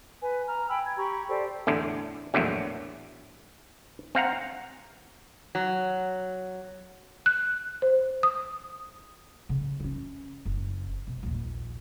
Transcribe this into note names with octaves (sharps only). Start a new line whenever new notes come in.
B4 G#5
A#5 F6
G5 G#5 B5 E6
G#6
G4 A#5 B5 C#6
G4 A4 C5 D5
E2 A2 D3
A#1 E2 A2 D3 F#3
C4 F5 F#5 A#5
F#3
F#6
C5
D#6
C#3
C#4 D4
F#1
B2
A#1 D#2